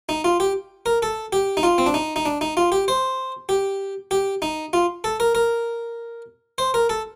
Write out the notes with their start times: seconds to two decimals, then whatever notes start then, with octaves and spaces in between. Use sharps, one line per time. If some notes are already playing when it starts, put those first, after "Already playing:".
0.09 D#4
0.24 F4
0.40 G4
0.86 A#4
1.02 A4
1.33 G4
1.57 D#4
1.63 F4
1.78 C4
1.86 D4
1.94 D#4
2.16 D#4
2.26 D4
2.41 D#4
2.57 F4
2.72 G4
2.88 C5
3.49 G4
4.11 G4
4.42 D#4
4.73 F4
5.04 A4
5.20 A#4
5.35 A#4
6.58 C5
6.74 A#4
6.89 A4